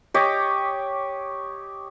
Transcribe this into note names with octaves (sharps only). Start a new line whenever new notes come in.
G4 C#5 D#5 D6